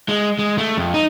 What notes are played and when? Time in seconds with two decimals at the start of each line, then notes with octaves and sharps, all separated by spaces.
0.09 G#3
0.39 G#3
0.58 A3
0.77 F2
0.94 D#4